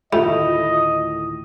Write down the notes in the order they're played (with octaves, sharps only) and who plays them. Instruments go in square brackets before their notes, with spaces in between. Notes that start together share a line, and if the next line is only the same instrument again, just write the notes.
[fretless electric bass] D2 A2 D#3 [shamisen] A3 [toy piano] F4 B5 [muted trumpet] D#5